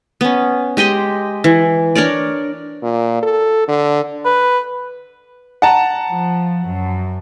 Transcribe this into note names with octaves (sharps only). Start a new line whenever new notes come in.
B3 C#4
G#3 G4 D#5 C6
E3
D4 A#4 C#5 D5
A#2
A4
D3
B4
F#5 A5 A#5
F3
F#2